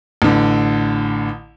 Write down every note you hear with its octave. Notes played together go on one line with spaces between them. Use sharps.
A1 D3